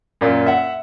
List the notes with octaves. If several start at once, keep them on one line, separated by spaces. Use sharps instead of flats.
F#2 A#2
E5 F#5